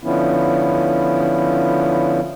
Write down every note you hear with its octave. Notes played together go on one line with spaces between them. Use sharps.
D3 F3 B3 C#4 E4